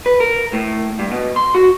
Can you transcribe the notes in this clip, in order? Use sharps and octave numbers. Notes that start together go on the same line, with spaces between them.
B4
A#4
A2
G2
B2
C6
F#4